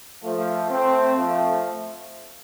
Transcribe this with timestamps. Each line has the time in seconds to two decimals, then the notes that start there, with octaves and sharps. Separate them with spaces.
0.23 F3 A3
0.70 A3 C4
1.16 F3 A3